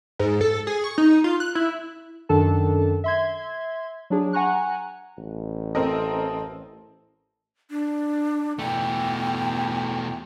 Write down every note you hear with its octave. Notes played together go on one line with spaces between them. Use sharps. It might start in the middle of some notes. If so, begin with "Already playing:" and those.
G#2
A4
G#4
C#6
D#4
F4
F#6
E4
F#2 D#3 D4 A4 A5
E5 C6 G#6
F#3 D4 G#4
F#5 G#5 A#5 C#6 F#6
A1
C4 A4 A#4 D#5
D4
E2 B2 A3 G5